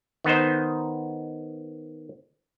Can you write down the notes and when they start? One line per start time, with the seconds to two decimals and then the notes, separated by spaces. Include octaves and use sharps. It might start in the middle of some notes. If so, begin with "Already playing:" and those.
0.24 D#3 B3 D#4 C5